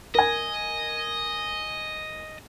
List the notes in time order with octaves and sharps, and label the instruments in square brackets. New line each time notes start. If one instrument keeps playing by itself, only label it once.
[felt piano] A#4 G#5 [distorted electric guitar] D#5